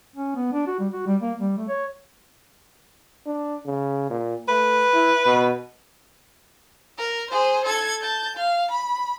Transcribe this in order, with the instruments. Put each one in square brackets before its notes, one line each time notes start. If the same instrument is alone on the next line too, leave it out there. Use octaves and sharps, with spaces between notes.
[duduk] C#4
B3
D4
F#4
G3
F#4
G3
A#3
G3
A3
C#5
[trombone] D4
C#3
A#2
[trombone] A3 [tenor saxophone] B4
[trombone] E4
B2
[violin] A#4
G#4 C5
A4 G#6
A5 G6
F5
B5